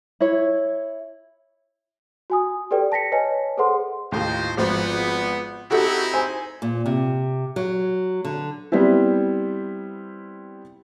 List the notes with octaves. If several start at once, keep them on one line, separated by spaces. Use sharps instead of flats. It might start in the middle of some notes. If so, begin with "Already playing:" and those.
E4 C#5
F#4 G#5 D#6
G4 A4 B4 D5 G5
A5 A#6 B6 C#7
B4 C#5 D#5 G#5 A5
G#4 A4 B4 C5 F#5 C6
D#2 A2 D#4 F4 C5
G#1 F3 B3 C5
C4 D#4 E4 F#4 G4 A4
C5 G#5
A#2
C3
F#3
D3
G3 B3 C4 E4